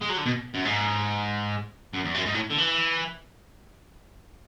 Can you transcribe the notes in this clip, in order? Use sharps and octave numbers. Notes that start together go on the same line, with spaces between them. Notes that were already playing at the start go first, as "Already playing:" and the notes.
G#3
F#3
D3
B2
F#2
G#2
F#2
E2
F#2
G#2
A2
D3
E3